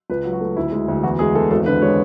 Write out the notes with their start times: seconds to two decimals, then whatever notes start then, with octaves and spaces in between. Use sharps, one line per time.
0.10 C#2 B4
0.25 F#3
0.33 F#4
0.41 A3
0.56 D2 E4
0.72 G#3
0.88 D2
1.03 E2 F#4
1.19 G#3 G#4
1.35 E2 A4
1.51 G#1 A4
1.66 D3 B4
1.82 G#3 C#5